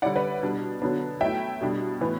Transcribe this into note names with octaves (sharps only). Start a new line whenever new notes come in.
D3 G3 C#4 E4 D5 F#5
B4 D5
B2 G3 D4
D3 F#3 B3 D4
F#3 A3 E4 E5 G5
B2 G3 D4
A2 E3 B3